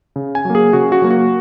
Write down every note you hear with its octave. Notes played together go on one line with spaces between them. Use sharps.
C#3
G#5
F#3 A#3
G#4
C#3 F#4
F#4
F#3 A#3
F#4